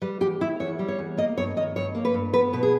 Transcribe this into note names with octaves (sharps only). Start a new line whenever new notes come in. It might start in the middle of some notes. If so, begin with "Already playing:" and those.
G3 B4
E2 G4
D#3 E4
E2 C#5
G3
C#5
E2
A#3 D#5
G2 C#5
D#3 D#5
G2 C#5
A#3
B4
G2
B3 B4
B2 B4
G#4